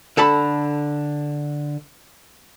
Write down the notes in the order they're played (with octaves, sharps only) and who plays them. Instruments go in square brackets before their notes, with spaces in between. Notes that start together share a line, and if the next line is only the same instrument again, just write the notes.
[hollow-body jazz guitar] D3 A4 A5 B5